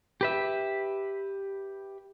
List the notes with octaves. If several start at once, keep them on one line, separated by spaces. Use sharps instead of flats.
G4 B4 E5